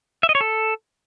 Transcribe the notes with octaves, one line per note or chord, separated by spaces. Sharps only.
E5
D#5
C#5
A4